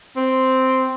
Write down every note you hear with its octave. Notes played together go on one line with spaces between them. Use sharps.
C4